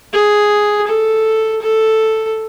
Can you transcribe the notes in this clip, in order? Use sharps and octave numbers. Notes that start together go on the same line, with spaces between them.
G#4
A4
A4